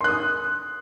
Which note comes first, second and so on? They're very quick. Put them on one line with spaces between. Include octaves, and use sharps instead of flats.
C6 F#6 D#6